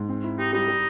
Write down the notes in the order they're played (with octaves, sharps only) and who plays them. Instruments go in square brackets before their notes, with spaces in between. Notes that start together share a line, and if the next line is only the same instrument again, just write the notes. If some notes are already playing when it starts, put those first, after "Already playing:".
Already playing: [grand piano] G#2
C4
E4
[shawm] D#4 [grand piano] G4
[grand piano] G3 [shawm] D#4
[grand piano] G3